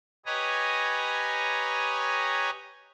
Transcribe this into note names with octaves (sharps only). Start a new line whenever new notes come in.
G4 B4 C#5 D#5 G#5 A#5